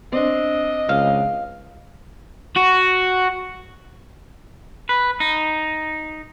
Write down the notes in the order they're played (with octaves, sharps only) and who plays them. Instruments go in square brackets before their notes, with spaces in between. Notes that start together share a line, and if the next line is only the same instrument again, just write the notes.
[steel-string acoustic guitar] C4 D4 [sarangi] D#5
[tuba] C#2 [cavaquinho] F5
[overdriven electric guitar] F#4
[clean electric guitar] B4
D#4